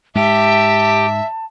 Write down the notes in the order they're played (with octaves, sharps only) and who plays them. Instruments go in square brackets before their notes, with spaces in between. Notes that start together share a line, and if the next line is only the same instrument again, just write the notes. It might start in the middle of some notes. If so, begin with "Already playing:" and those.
[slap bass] G#2 G#3 [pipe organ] G4 G5 [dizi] E5 [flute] A5